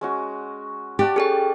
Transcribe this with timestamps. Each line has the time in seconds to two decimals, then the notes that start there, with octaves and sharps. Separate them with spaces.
0.01 G#3 C#4 F#4
0.99 G4 D5 F#5 A5
1.16 C#4 G#4 A4 D5 G5